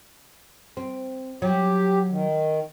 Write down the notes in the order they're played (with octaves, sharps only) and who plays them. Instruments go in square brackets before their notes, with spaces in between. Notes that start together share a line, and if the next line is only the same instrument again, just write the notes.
[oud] C4
[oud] F#3 [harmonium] G4
[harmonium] D#3